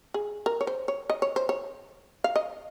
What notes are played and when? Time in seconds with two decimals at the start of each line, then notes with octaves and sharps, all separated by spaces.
0.14 G#4
0.46 A#4
0.61 C#5
0.67 C5
0.88 C#5
1.10 D#5
1.22 C#5
1.36 C5
1.49 C#5
2.24 F5
2.36 D#5